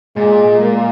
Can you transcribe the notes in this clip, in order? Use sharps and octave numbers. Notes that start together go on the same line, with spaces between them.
A#2 G#3
A#3